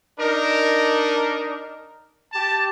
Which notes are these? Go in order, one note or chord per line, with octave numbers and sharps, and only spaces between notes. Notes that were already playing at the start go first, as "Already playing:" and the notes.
D4 D#4 A#4
G4 A5